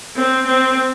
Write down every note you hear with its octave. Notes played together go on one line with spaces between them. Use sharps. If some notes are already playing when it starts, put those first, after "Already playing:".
C4
C4